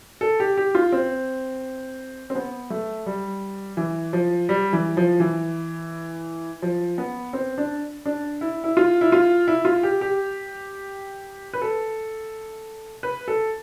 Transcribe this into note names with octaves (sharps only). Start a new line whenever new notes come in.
A4
G4
G4
F4
C4
C4
B3
A3
G3
E3
F3
G3
E3
F3
E3
F3
B3
C4
D4
D4
E4
E4
F4
E4
F4
E4
F4
G4
G4
B4
A4
B4
A4